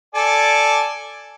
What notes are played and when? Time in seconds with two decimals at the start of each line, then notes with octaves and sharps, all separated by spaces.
0.15 A4 D5 G#5